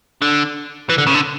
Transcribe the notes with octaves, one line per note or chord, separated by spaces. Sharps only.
D3
E3
D3
C#3
D3